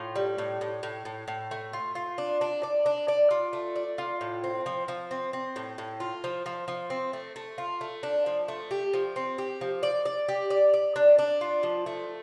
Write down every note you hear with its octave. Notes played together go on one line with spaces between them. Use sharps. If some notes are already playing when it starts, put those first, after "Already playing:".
Already playing: A2 F4
G3
A2
A2
A2
A2
A2
A3
F4
F4
D4
D4
D5
D4
D5
F4
A3
D5
F4
A2
C4
F3
F3
C4
C4
A2
A2
F4
F3
F3
F3
C4
A3
A3
F4
A3
D4
F3
A3
G4
F3
C4
G4
F3
D5
D5
G4
D5
D5
D4
D4
F4
F3
A3